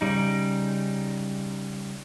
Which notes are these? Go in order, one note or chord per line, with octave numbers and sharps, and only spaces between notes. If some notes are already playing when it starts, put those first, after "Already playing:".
C#3 G3 D#4